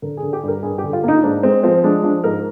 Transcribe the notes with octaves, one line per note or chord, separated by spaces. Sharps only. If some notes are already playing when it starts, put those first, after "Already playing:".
D3 A#4
G#4
D3
G4
G2 A#4
G2 G#4
G4
D3
F4
A#3 D#4
G#2 D4
G#3 C4
F3 C4
G#3 D4
F3 D4
G#2 A#4